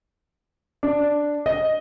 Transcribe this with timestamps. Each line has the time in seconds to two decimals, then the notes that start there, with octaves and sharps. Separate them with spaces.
0.83 D4
1.46 D#5